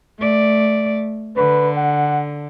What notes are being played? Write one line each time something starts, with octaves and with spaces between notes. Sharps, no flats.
A3 D5
D3 B4
F#5